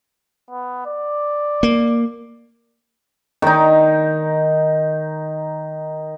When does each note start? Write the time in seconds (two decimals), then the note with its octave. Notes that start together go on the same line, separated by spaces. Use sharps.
0.50 B3
0.86 D5
1.63 A#3
3.42 D#3 D#4